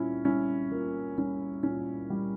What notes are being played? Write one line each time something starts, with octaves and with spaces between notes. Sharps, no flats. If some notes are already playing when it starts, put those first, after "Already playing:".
Already playing: A#2 G3 C#4 E4
G3 C#4 E4
A#2 A#3
G3 C#4
A#2 C#4
G3